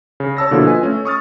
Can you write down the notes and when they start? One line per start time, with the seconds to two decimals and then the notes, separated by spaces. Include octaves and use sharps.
0.20 C#3
0.37 C#5 A5 E6 A#6
0.51 B2 D3 F3 A#3 E4 A4
0.65 F4 B4 D#5 G#5
0.83 A3 C#4
1.05 C#6 D#6 F6 A6